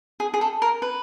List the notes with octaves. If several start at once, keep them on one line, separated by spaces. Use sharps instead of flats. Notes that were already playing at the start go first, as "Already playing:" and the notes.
G#4
G#4
A4
A#4
B4